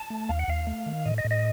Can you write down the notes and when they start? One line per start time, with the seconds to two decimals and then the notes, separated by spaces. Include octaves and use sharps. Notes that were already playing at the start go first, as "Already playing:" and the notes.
Already playing: A5
0.10 A3
0.29 D#2 F5
0.39 F#5
0.48 D#2 F5
0.67 A3
0.86 D#3
1.05 A2 D#5
1.18 D#5
1.25 A2
1.31 D#5